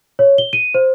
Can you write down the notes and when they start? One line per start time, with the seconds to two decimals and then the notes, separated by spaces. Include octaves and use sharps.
0.19 C#5
0.38 G7
0.53 D#7
0.74 C5